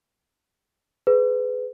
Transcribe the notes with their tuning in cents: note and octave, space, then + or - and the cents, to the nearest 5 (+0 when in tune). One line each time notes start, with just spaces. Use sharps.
G#4 +25 B4 +25